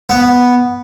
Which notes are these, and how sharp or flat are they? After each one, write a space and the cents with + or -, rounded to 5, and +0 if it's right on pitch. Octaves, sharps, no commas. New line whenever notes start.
B3 -5